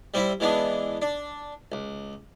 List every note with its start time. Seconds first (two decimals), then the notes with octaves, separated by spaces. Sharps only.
0.14 G3 C4 E4 E5
0.40 E3 G#3 B3 D4
1.02 D4
1.72 C#2